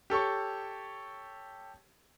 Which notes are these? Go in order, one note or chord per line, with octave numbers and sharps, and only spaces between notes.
G4 A4 C#5 C#6